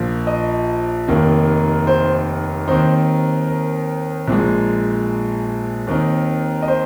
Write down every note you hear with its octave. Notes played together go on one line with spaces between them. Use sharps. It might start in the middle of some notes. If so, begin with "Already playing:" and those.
Already playing: A#1 A#2 F3 A#3
D#5
F1 D#2 D#3 A#3 D#4
C5
D#2 D#3 C4 D#4 C5
A#4
A#1 A#2 G#3
D#2 D#3 C4 D#4 A#4
D#5
C5